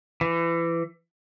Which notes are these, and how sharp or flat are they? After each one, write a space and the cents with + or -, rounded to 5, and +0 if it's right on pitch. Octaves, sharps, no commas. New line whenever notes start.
E3 +25